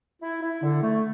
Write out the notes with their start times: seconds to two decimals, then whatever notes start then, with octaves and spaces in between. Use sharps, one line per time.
0.22 E4
0.42 E4
0.63 D3
0.83 A3